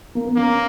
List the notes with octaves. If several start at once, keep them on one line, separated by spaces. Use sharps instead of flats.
A#3
B3
A#3 C#4